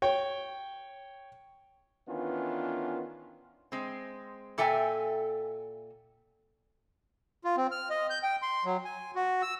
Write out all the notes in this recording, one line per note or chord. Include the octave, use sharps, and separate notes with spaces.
C#5 G5
D#3 E3 B3 C#4 D4 F4
G#3 C4
A#2 A4 E5 G5 G#5 A#5
F4
C4
F6
D#5
G6
G5
C6
F#3
G#5
F#4
E6